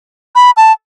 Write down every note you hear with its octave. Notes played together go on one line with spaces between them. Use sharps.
B5
A5